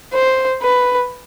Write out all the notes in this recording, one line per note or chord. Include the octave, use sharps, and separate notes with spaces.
C5
B4